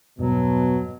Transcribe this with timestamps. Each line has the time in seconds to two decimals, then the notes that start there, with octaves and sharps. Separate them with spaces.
0.19 E1 G2 B2 F#3